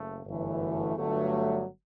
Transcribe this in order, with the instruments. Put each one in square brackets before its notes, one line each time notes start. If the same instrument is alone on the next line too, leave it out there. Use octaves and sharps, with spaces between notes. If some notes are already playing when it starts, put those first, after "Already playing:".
Already playing: [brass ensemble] F#1 A3
G1 F#2 E3 A3
G1 G2 F#3 A3